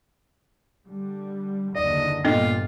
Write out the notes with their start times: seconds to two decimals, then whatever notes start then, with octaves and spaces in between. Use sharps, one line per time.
0.86 D3 G3
1.75 F#1 D#2 D3 D5 D#5
2.25 G1 G2 A#2 G3 B3 F4 A4 D#5